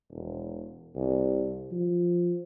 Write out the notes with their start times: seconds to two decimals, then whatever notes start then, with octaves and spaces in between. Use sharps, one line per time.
0.11 E1
0.95 C2
1.72 F3